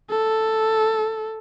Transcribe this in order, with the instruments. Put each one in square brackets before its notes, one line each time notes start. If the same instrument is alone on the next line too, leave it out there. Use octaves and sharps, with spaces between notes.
[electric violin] A4